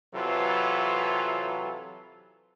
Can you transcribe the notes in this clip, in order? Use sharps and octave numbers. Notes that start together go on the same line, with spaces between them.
C3 E3 F#3 F4 A4 B4